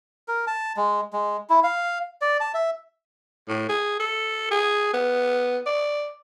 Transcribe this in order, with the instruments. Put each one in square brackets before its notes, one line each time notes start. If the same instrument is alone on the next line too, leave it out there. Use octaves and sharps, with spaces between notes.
[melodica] A#4
A5
G#3
G#3
E4
F5
D5
A5
E5
[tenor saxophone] A2
G#4
A4
G#4
B3
D5